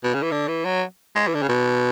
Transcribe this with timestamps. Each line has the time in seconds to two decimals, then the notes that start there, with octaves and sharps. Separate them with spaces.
0.04 B2
0.14 C#3
0.22 E3
0.31 D3
0.48 E3
0.65 F#3
1.16 G#3
1.28 E3
1.34 D3
1.42 C#3
1.49 B2